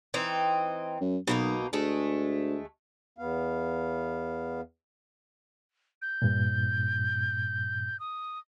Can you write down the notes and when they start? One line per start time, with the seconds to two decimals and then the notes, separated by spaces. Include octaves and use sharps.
0.14 E3 C4 D#4
1.01 F#2
1.27 B1 B2 A#3 D#4
1.73 D2 G#3 A3
3.18 E2 B3 F5
6.02 G6
6.22 G2 A#2
8.00 D#6